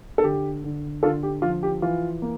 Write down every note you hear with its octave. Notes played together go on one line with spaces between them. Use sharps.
A4
D3 G4
D3
D3 F4 A4
G4
F3 F4
G4
E3 F4
A#3